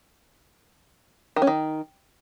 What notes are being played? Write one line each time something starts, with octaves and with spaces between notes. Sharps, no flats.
D#3
C#4
D#3